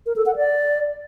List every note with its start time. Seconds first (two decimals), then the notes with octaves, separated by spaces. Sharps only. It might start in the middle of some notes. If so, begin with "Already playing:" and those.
0.06 A#4
0.16 A4
0.26 F#5
0.36 D5